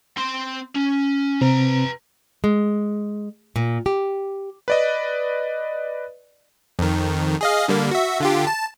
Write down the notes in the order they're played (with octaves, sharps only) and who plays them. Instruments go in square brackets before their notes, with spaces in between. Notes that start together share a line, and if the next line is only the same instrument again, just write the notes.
[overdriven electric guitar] C4 C6
C#4
[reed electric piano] C3 C4 [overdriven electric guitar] B4 A#5
[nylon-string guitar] G#3
A#2
G4
[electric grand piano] B4 D5 D#5
[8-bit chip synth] F2 D#3
G#4 D#5 F5
D3 G3 A#3
F#4 E5
D3 F4 G4
A5